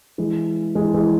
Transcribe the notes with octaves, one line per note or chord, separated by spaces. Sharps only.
E3 G#3
E3 G#3
E3 G#3